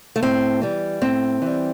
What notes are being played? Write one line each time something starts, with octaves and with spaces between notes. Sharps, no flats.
A3
A2 C4
E3 G3
A2 C4
E3 G3